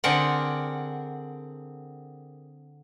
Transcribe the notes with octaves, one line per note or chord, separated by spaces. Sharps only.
D3 C4 G#4 A#4 D5 F#5